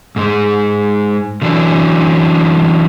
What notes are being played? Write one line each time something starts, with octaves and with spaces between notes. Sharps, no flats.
G#2 G#3
D3 E3 F#3 D4